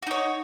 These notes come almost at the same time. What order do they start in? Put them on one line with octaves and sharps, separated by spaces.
F#4 D#4 C#5